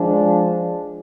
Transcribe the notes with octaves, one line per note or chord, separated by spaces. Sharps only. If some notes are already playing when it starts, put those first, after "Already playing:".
Already playing: F3 G#3 D4